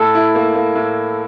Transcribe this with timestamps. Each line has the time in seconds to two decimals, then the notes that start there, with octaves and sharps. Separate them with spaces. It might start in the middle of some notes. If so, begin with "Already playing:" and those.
Already playing: A2 A4
0.15 E4
0.35 A#3
0.55 A#3
0.75 A2